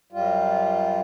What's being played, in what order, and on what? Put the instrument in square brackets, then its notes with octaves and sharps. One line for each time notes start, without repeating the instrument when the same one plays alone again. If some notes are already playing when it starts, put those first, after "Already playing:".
[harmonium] F#2 G3 F4